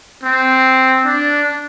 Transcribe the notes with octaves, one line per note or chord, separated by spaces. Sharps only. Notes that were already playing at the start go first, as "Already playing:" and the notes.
C4
D4